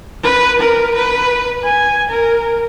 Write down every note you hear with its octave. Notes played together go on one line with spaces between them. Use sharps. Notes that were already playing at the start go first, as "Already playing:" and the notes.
B4
A#4
B4
G#5
A#4